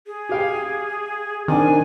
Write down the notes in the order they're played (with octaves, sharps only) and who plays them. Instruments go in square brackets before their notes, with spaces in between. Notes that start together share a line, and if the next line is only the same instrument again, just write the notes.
[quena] G#4
[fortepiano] G4 F5 G5
[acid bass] D#3 [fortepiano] C4 D4 [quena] G#5